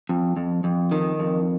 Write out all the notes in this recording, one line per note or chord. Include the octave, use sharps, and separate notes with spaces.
F2
F2
F2
D#3
F2